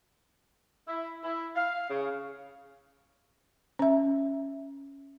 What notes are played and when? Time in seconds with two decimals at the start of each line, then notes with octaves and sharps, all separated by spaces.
0.87 E4
1.23 E4
1.55 F5
1.90 C#3
3.79 C#4 E5